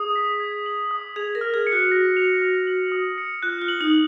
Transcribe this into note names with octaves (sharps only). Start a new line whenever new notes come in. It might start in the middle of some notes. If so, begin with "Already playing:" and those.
Already playing: G#4 D#6
B6
G#6
F#7
D#6
G#4 F7
A#4
F6
G#4
C#7
F#4
A#6
F7
F6
F#7
D#6
C#7
F4 F#6
F4
F#7
D#4